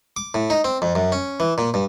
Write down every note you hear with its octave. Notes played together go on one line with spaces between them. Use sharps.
D6
A2
D#4
C4
F2
F#2
C#4
E3
A#2
G2